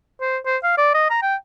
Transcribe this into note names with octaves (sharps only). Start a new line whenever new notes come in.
C5
C5
F5
D5
D#5
A#5
G5